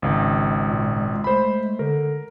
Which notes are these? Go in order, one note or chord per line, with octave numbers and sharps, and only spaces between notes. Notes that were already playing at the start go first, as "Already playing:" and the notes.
G#1 C#2 G#3
A#2
A3 C5 B5
D3 A#4